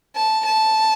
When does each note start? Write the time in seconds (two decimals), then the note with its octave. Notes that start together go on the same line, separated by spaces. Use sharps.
0.16 A5
0.46 A5